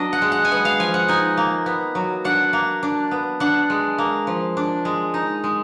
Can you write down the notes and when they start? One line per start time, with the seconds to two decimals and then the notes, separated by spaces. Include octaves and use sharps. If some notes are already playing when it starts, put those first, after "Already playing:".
Already playing: F#3 B3 D4 D#5
0.13 F#5
0.22 G#3
0.32 F#5
0.45 G#5
0.51 B3 F#5
0.65 F5
0.79 F3 G#5
0.94 F#5
1.08 D#4 G#5
1.37 A#3
1.66 B3
1.95 F#3
2.25 D4 F#5
2.53 A#3
2.83 D4
3.11 B3
3.40 D4 F#5
3.70 G#3
3.98 A#3
4.27 F3
4.57 D4
4.85 G#3
5.14 D#4
5.44 G#3